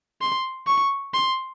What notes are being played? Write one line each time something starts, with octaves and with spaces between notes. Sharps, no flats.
C6
C#6
C6